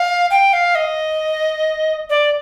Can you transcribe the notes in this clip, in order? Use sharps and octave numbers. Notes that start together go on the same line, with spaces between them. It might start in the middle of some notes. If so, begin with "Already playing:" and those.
Already playing: F5
G5
F5
D#5
D5